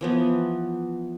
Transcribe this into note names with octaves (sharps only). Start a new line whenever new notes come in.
E3 F3 B3